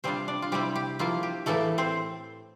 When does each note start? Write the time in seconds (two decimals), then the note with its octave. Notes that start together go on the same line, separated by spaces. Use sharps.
0.04 C3 G3 C4 D4 F4 C5
0.28 D4 D5
0.42 F4
0.52 C3 G3 C4 E4 G4
0.76 G4
0.99 F3 A#3 E4 F4
1.23 G4
1.46 A2 E3 A3 A#3 E4 A4
1.78 C4 C5